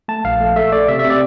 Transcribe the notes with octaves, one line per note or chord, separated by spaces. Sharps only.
A3 A5
A#1 F5
A3
A3 E5
A3 D5
C3 E5
E5
C3
D5